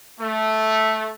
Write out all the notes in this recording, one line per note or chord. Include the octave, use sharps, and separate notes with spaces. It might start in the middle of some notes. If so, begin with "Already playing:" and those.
A3